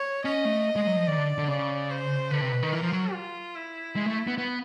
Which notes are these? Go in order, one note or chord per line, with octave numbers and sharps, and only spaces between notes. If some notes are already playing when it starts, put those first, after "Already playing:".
Already playing: C#5
C#4 D#5
A3
G#3
F#3
F3
D#3 D5
D3
D3
C#3 D5
C5
D3 B4
C3
B2
D#3
E3 A#4
F3
F#3
F4
E4
G#3
A3
B3
B3